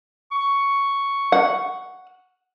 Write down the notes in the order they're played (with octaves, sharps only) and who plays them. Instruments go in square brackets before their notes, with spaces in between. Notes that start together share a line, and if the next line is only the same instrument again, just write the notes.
[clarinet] C#6
[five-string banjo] F#5